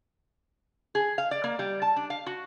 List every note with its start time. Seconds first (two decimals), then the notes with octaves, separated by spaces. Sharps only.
0.95 G#4
1.18 F5
1.31 D5
1.44 A#3
1.59 G3
1.82 A5
1.96 D4
2.10 F5
2.26 F#4